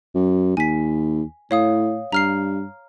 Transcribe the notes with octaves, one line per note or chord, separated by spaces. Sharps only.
F#2
D#2 G#5 B6
A2 C#5 F5 D#6
G2 A#5 F6 C7